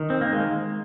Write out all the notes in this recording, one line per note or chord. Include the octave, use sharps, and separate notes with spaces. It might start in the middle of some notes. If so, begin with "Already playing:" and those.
Already playing: D#3
C4
A#3
G#3